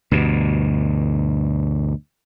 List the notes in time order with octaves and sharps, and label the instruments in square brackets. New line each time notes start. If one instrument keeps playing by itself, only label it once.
[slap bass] D2 G2 B2